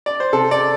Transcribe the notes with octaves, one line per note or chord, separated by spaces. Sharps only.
D5
C5
C3 A4
D5